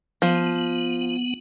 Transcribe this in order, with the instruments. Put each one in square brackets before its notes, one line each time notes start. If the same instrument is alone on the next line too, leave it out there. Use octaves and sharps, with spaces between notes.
[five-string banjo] F3 [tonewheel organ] B3